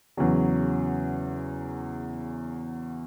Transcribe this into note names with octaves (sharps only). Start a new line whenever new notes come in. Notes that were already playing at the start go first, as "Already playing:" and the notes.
E2 C#3 F#3